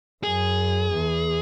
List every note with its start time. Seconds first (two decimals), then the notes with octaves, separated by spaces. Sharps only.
0.23 F#2 G#4
0.93 E2